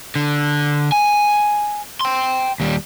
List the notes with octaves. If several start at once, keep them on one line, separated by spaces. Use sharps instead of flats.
D3
G#5
G5 C6
D#2 G3